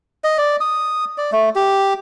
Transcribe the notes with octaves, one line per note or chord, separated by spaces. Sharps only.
D#5
D5
D#6
D5
A3
G4